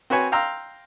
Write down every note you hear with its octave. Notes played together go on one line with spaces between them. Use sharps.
C4 F#4 B4 C#5 G#5
F5 G5 A#5 C6 E6